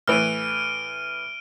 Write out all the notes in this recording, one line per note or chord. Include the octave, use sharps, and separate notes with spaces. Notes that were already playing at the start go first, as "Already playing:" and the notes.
A2 E3 F6 D7 D#7